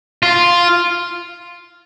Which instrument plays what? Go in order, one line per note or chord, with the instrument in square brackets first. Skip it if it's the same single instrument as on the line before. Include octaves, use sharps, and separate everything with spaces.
[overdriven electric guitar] F4